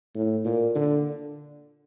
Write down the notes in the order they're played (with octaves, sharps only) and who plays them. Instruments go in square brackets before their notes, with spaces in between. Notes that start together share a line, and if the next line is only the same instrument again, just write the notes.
[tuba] A2
A#2
D3